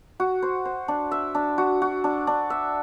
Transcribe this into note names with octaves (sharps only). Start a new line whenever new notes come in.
F#4
C5
C5
D4
E5
D4
F#4
F#4
D4
D4
E5